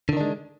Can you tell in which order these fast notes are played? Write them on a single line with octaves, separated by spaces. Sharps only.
D3 D#3 D4 G#3